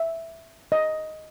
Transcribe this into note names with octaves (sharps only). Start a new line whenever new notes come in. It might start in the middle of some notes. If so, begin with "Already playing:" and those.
Already playing: E5
D#5